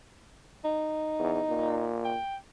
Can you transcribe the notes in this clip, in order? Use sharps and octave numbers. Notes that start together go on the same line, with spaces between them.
D#4
E2
A#2
G5